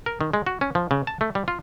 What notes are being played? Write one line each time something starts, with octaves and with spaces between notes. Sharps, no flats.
A#4
D#3
G#3
F#4
C#4
F3
C#3
A5
A3
G3
F4